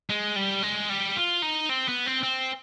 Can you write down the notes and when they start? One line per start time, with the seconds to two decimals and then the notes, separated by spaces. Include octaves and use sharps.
0.10 G#3
0.36 G3
0.63 G#3
0.90 G3
1.17 F4
1.42 D#4
1.70 C4
1.88 B3
2.06 C4
2.23 C4